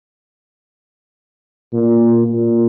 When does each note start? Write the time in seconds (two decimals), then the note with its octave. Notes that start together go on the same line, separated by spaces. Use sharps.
1.73 A#2
2.24 A#2